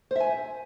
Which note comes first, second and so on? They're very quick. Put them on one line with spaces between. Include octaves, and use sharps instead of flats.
C5 E5 G#5